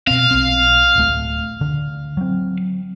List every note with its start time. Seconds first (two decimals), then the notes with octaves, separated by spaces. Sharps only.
0.07 B2 C4 F5
0.31 B1 C4
0.96 D1 A3
1.61 D3
2.17 F#3 C4